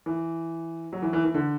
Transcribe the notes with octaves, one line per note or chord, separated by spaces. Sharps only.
E3
F#3
E3
E3
E3
D3